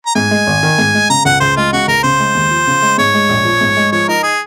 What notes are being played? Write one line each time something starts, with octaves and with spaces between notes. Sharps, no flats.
A#5
G#2 G#5
G#3
G#1
D#3
G#2
G#3
C#3 A#5
C#2 F#5
C#2 C5
G#3 F4
C#3 F#4
C#2 A#4
C#3 C5
G#3
D#2
F3
C#3
G#3
G#2 C#5
G#3
A#1
F3
G#2
G#3
F3 C#5
D#4 A#4
G#4